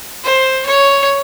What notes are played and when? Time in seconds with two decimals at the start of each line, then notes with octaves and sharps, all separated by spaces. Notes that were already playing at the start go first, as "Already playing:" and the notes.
0.24 C5
0.66 C#5